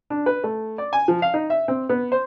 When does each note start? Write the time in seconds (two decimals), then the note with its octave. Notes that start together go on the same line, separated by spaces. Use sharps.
0.10 D4
0.26 B4
0.44 A3
0.78 D5
0.93 G#5
1.08 F3
1.22 F5
1.34 D#4
1.50 E5
1.68 C4
1.89 B3
2.12 C5